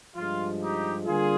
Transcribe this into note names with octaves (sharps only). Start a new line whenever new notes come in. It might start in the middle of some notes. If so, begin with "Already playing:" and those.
G2 F3 G#3 F4
D#4 G4
D3 G3 A#3 D4 F4 G#4